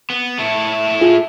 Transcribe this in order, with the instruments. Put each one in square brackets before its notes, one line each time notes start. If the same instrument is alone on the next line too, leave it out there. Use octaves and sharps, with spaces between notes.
[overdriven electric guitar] B3
A3 E4
[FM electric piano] F4 G#4